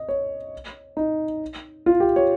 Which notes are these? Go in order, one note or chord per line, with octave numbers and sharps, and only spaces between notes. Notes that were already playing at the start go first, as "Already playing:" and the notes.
Already playing: D#5
C#5
D#4
F4
G4
C#5